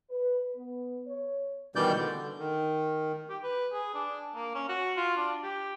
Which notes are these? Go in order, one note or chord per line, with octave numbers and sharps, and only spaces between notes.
B4
B3
C#5
B2 D#3 E3 G3 D5 G6
D3
D#3
G4
B4
G#4
D4
A#3
C#4
F#4
F4
D4
G4